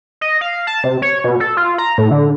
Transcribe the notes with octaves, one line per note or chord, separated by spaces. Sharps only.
D#5
F5
A5
C3
C#5
B2
A4
F4
A#5
A2
D3